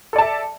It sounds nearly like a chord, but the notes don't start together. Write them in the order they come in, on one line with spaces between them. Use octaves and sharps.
A4 D5 A5 E5